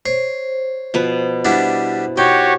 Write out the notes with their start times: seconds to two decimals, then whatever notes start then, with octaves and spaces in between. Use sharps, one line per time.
0.06 C5 C#5
0.94 B2 F3 B4
1.45 G3 B3 D4 E4
2.17 D#4 F#4 G4 C#5 G5